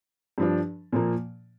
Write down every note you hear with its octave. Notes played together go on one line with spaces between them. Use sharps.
G2 F3 D4
A#2 F3 A#3